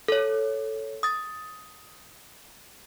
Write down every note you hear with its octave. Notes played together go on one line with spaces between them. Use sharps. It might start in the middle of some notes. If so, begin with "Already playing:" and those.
A4 C#5
D#6 A6